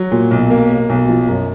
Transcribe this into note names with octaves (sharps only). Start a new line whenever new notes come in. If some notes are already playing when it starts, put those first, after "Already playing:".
Already playing: F#3
A#2
B1
A#3
A#3
B1
F3
F#2